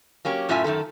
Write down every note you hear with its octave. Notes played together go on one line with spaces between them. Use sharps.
F#3 A#3 C#4 G4
F#2 A2 C#4 F4 E5 G#5
F#2 D#3 A3 A4